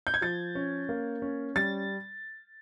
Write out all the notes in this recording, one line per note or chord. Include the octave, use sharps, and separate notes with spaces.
G6
G#6
F3 A6
C#4
A#3
C#4
G3 A6